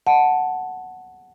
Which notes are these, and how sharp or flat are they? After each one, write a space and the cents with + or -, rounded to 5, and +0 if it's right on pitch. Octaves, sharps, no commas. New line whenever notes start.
F#5 +0 A5 +0